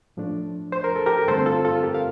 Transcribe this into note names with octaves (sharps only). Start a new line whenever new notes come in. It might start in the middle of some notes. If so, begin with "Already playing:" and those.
A2 F3 A3 D4
C5
A#4
A4
G4 A#4
G2 D3 A3 C4 A4 C5
F4 A4
F4 A4
G4 A#4
F5